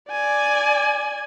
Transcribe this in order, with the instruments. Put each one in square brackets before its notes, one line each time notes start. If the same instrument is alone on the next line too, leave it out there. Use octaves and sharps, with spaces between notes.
[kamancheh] D5 G#5